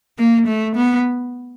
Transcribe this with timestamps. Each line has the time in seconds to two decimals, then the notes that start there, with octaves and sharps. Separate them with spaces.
0.18 A#3
0.47 A3
0.76 B3